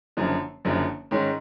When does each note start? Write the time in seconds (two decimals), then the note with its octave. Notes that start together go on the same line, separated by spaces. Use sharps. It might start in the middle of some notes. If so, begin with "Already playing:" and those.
0.17 F#1 F#2 D3 F3
0.65 F#1 F#2 D3 F3
1.11 G#2 D#3 G#3 C#4